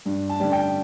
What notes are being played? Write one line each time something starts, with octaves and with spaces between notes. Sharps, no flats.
G2
A5
D3 G3
G5